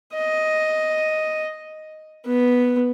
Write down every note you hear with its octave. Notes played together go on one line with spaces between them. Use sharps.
D#5
B3